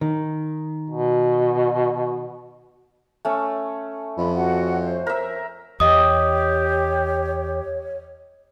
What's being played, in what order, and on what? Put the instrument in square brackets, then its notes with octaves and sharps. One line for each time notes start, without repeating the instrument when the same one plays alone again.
[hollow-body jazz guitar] D#3
[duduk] B2
[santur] A3 C#4
[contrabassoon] F2 [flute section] B5
[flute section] F#4 F#5
C5
[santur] A#4 E5
[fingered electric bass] E2 [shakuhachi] G4 [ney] C#5 [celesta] D#5 D#6